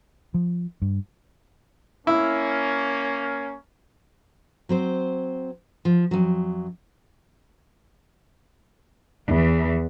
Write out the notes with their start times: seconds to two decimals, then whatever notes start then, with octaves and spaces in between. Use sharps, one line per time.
0.34 F3
0.82 G2
2.07 A#3 C#4 E4
4.69 F#3 C4 C5
5.85 F3
6.11 F2 F#3
9.27 E2 E3